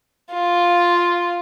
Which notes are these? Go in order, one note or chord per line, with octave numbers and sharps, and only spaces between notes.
F4